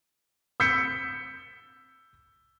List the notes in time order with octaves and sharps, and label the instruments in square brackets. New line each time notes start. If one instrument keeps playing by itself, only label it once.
[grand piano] E6 G6 B6 C#7